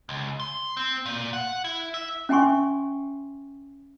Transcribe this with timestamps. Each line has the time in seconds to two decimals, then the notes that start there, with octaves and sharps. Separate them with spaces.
0.09 C#2
0.40 C6
0.77 C4
1.06 A#2
1.33 F#5
1.64 E4
1.94 E5
2.29 C#4 E5 G5 G#5 C6 C#6